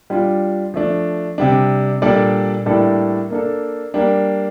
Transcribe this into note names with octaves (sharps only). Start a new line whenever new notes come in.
G3 D4 F4
F3 A3 D4
C3 G3 D4
A#2 G3 D4 A4 D5
A2 G3 A#3 D4 A4
A#3 D4 A4
G3 A#3 D4